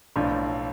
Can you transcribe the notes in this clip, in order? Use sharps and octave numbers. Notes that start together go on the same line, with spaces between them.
B1 A2 F3 D4